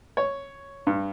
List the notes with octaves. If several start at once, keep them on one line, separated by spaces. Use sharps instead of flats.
C#5
G2